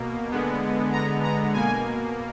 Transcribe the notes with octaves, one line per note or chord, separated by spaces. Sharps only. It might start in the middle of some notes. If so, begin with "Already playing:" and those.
Already playing: B2 A#3
D3 G#3 B3
A#5
A#5
B2 A#3 G#5